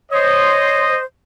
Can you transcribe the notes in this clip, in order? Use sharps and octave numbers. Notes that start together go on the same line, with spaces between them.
C5 C#5 D#5